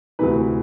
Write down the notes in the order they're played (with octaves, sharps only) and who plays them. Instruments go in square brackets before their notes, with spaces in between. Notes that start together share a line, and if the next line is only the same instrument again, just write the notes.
[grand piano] D2 C3 E3 B4